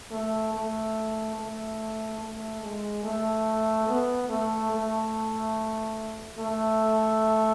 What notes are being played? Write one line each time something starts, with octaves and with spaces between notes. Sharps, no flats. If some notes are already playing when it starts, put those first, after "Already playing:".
A3
A3
A3
A3
G#3
A3
B3
A3
A3
A3